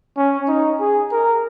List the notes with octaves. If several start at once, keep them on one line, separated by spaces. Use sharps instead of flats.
C#4
D#4
G#4
A#4